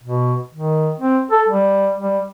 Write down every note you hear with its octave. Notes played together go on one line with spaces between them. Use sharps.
B2
D#3
C4
A4
G3
G3